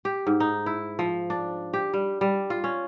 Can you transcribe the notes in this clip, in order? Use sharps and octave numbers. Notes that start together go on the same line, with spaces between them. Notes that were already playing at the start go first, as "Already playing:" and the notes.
G4
G#2
D#4
E4
F3
D4
G4
G3
G3
F4
C#4